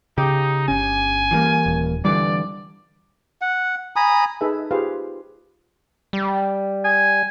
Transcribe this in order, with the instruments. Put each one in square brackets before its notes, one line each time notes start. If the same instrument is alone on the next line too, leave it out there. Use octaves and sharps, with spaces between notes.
[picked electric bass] C#3 [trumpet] D#4 [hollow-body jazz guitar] G4
[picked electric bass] G1 C#4 [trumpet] G#5
[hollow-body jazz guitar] E3 G3 A#3
[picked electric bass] D#1
[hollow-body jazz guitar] G2 D3 E3 [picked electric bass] G3 [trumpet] D5
[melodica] F#5
G#5 A#5 B5 D#6
[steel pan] D#4 G#4 A4 B4 E5
F4 G4 G#4 B4 C5 F5
[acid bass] G3
[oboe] G#5